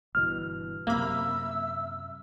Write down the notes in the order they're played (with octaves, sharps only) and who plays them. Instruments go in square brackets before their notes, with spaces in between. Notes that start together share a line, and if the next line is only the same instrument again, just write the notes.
[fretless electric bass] G1 B2 E3 [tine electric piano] F6
[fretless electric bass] F#2 C3 [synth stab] A#3 B5 [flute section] E5 E6